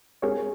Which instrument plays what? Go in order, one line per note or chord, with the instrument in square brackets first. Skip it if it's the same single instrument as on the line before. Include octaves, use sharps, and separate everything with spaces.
[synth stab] G#3 C4 G4 A#4 C#5 [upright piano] G#4